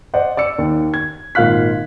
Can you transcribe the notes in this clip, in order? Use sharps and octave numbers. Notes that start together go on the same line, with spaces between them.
C5 D5 D#5 F#5
D5 E6 C#7
D#2
G#6
G#1 A#2 F4 F5 F#6 B6